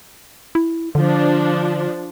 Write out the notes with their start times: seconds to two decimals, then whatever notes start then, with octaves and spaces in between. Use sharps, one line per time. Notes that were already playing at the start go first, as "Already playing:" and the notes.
0.55 E4
0.95 D3 F3 D4